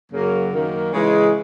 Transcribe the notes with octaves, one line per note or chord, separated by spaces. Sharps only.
F#2 C#3 F#3 A#3
F#2 D#3 A#3
C#3 E3 G#3